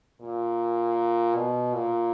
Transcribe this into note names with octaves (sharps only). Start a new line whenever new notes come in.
A#2
B2
A#2